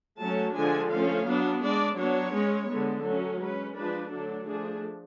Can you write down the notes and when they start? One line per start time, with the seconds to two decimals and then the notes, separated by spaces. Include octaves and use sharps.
0.20 F#3 A3 C#4 A5
0.55 D3 F3 G#3 D4 G#5
0.91 F3 A3 C#4 F5
1.27 F#3 B3 D4
1.63 G#3 D4 D5
1.98 F#3 B3 D4 C#5
2.33 G#3 C#4
2.69 D3 G#3 B3
3.04 F#3 A3 C#4 A4
3.40 G#3 C#4 B4
3.76 F3 G#3 D4 B4
4.11 D3 F#3 A3 D4 A4
4.47 F3 A3 D4 G#4